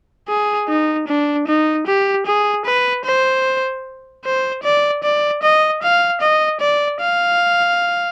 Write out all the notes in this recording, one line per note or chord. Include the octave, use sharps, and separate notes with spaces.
G#4
D#4
D4
D#4
G4
G#4
B4
C5
C5
D5
D5
D#5
F5
D#5
D5
F5